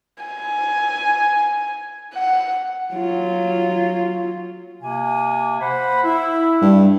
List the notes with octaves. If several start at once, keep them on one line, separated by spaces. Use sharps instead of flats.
G#5
F#5
F#3 F4
C3 A#3 G#5
C5 F#5 B5
E4
G2